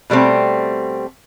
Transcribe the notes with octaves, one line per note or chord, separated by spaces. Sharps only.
B2 G3 A3 C4